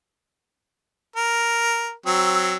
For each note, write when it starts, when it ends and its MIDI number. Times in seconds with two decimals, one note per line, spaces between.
1.16 1.93 70
2.06 2.56 54
2.06 2.56 60
2.06 2.56 88